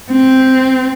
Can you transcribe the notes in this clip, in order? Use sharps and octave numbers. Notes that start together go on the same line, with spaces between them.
C4